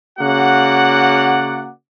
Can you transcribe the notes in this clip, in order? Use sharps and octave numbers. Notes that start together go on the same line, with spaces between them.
C#3 A#3 F#4 D5 F#5